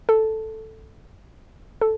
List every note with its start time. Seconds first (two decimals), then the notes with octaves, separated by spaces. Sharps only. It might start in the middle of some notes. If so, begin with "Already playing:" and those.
0.09 A4
1.81 A4